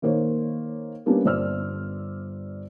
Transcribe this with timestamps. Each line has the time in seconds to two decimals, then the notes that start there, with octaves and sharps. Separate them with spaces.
0.02 D#3 A#3 C5 C#5
1.06 G3 A#3 B3 C#4 D4
1.25 G1 C5 D5 E6 F6